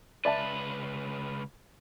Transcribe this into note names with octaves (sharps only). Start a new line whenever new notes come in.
C#2 B4 D5 E5 A5